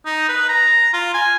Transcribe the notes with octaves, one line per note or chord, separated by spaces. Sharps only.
D#4
B4
A#5
F4
G#5